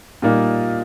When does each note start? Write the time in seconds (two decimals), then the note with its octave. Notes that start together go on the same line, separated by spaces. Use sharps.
0.22 A#2 G3 A#3 D#4